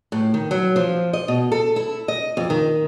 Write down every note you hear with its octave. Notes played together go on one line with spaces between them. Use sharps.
A2
D#3
F#3
F3
D#5
B2
A4
E4
D#5
F2
D#3